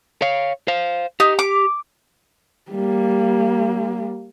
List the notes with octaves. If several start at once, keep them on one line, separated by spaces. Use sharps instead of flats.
C#5 F5
C5 F5
D#4 G4
D6
G3 A#3